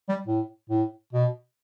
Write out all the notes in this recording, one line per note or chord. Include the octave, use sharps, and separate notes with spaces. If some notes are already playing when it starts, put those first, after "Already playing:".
G3
A2
A2
B2